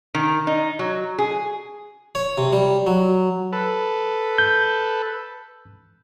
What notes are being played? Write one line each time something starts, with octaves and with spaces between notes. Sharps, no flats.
D#3
D#4
F#3
G#4
C#5
C3
G3
F#3
A4 B4
G6